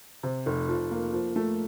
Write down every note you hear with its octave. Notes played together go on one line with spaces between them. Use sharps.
C3
F1
F3
A#3
F3
A3